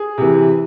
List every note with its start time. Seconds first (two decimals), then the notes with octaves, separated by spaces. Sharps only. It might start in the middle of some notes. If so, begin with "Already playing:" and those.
Already playing: G#4
0.18 C3 E3